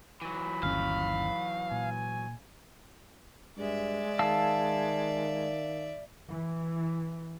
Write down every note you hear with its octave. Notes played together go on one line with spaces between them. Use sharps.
E3 F#3 B5
G1 D#2 C#4 F5
A#2 G#5
G2 G#3 D5 E5
D#3 F5 A5 E6
E3